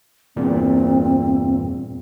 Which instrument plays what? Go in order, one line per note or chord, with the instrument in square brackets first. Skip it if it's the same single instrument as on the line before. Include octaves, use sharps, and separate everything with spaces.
[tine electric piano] E2 G2 A#2 [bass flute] C4